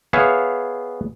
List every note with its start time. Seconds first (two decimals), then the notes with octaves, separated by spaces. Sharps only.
0.13 B3 G#4 C#5 E5 F5